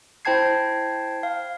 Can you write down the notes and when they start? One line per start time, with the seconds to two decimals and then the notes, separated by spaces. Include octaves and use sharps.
0.25 E4 C5 G5 A5 G#6 C7
1.23 F5